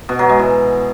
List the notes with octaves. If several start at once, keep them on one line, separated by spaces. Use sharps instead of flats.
B2
F#3
G#3
E3